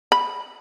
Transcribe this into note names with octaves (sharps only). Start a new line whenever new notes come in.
B5